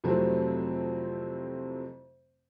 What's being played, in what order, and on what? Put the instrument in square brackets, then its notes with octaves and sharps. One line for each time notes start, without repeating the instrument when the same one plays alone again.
[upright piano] F2 C3 E3 F#3 A3 C4